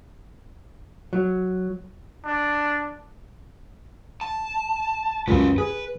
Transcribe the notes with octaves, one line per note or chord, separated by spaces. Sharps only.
F#3
D4
A5
C#2 F#2 C#4 B4
G#4 B4